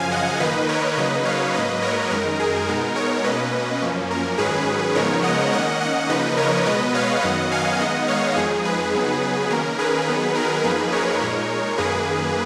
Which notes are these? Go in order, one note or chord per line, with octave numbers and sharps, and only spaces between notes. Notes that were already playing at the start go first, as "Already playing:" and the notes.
Already playing: F#2 C#3 F3 F5 G#5
D#5 F#5
D#3 A#3 D#4 B4 D#5
A#4 C#5
C#3 F#3 A#3 D#4 B4 D#5
C#5 F5
G#2 F#3 A#3 B4 D#5
A#4 C#5
F#2 D#3 G#3 D#4 A#4
G#4
B2 G#3 B3 D#4 A#4
A#4 C#5
B2 A#3 C#4 B4 D#5
F#2 F3 A#3 C#4
A#4
G#2 D#3 F#3 C#4 G#4 B4
C#3 F3 G#3 B3 D#4 A#4 C#5
D#5 F#5
D#3 A#3 C#4 D#5 F#5
D#5 F#5
C#3 F3 A#3 D#4 B4 D#5
A#4 C#5
B2 G#3 B3 B4 D#5
C#5 F5
F#2 D#3 F#3 B3 D#5 F#5
F5 G#5
D#3 G#3 B3 D#4 D#5 F#5
C#5 F5
F2 F3 G#3 D#4 G#4
G#4 B4
C#3 F#3 B3 D#4
D#3 A#3 C#4 A#4
G#4 B4
D#3 F#3 B3 D#4
A#4
F#2 F3 A#3 D#4 G#4 B4
A#4 C#5
A#2 G#3 D#4
F#2 D#3 A#3 G#4 B4